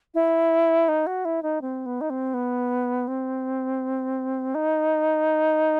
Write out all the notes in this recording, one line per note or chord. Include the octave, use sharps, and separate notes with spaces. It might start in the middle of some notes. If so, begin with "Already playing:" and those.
E4
D#4
F#4
E4
D#4
C4
B3
D#4
C4
B3
C4
D#4